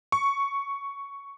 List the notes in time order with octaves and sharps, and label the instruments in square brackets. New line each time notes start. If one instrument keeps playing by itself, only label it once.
[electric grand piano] C#6